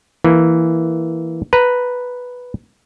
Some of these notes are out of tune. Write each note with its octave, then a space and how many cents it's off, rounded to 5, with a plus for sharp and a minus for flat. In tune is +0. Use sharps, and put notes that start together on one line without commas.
E3 +0 A#3 +0
B4 +0 A#5 +0